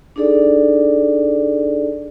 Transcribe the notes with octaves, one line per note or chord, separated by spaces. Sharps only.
D4 D#4 G#4 A4 D5